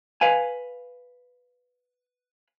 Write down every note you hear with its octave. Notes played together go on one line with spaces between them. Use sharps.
B4 F5 G#5